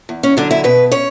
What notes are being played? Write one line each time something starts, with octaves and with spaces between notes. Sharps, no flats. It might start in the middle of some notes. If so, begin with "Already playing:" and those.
E2
C#4
D3 F#3 D4
E4
B2 B4
C#4 C#5